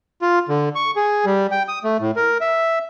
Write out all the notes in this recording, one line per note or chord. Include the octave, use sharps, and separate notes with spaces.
F4
D3
C#6
G#4
G3
G5
D#6
A3
A2
A#4
E5